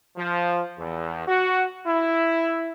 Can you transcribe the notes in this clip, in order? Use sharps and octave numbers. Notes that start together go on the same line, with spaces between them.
F3
E2
F#4
E4